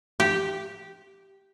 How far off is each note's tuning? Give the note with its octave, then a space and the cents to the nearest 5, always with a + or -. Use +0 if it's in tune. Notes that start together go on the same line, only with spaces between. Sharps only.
G4 -5